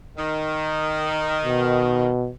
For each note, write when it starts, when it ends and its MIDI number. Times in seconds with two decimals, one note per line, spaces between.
0.17 2.08 51
1.45 2.30 47